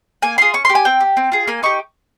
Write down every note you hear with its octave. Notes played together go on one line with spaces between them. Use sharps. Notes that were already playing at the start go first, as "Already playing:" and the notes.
A#3 G#5
F4 G#4 C6
C#4 C#6
C6
G4
G#5
C4 G5
G4
C4
F4 G#4
A#3 G#5
D#4 G4 C#6